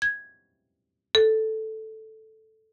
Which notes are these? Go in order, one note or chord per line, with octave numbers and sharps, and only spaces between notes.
G#6
A4